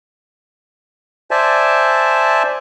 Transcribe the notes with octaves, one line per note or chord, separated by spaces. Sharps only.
C5 D5 E5 G#5 A5